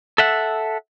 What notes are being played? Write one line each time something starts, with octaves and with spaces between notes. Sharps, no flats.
A4 E5 F#5